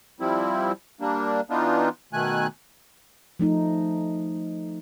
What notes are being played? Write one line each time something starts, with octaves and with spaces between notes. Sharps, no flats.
F3 G3 C4 E4
G3 A#3 D4
E3 B3 D4 D#4 F4
B2 D#3 A3 G#5 F#6
F3 A3 D#4